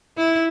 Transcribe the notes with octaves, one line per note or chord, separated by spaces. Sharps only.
E4